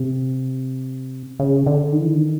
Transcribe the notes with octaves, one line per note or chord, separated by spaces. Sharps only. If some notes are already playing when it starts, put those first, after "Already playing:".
Already playing: C3
C#3
D3
D#3
E3
D#3
D3
D#3